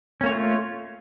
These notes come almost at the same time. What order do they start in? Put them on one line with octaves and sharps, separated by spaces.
C#4 A#3 C#5 A3 F4